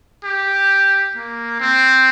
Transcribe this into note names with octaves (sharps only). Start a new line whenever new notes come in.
G4
A#3
C4